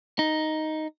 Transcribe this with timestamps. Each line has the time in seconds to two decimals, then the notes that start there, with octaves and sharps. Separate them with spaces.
0.19 D#4